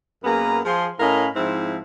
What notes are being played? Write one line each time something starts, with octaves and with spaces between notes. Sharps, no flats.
F#2 A#3 B3 G#4 B4 A#5
F3 G#4 C6
A2 C#4 A#4 D#5 F5 B5
G#2 F3 C4 E4